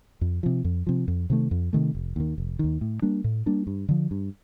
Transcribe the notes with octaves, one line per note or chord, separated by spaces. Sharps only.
F2
C3 F3
F2
C3 F3
F2
C3 D#3 A3
F2
C3 D#3 A3
F1
D#2 D#3
F1
D#2 D#3
A2
G3 A#3 D4
A2
G3 A#3 D4
G2
D3 F3
G2